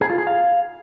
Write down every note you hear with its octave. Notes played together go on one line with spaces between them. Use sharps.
G#4
F4
G#4
F5